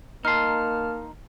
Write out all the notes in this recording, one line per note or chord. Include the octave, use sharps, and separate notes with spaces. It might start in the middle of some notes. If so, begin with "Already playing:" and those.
A#3 D#4 A5 C6 F6